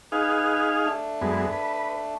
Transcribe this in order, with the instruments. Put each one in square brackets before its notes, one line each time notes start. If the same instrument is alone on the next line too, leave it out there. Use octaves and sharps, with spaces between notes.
[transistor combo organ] D#4 G#4 F5 [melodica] B4
[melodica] A3 D4
[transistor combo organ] F#2 G#3 B3
B4